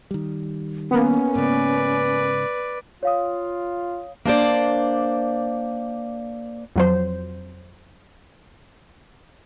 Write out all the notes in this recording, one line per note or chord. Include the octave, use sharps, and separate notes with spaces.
D#3 G3
A#3 B3 C#4
G#2 C#3 B4 D5
F4 C#5 F5 D#6
A#3 D4 C5 D5
F2 F#3 C5